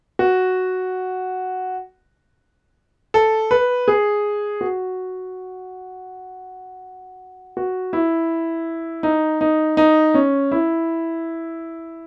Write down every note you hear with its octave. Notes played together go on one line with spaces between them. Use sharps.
F#4
A4
B4
G#4
F#4
F#4
E4
D#4
D#4
D#4
C#4
E4